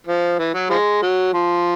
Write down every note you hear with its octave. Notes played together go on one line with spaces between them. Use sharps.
F3
E3
F#3
F3 G#3
F#3
F3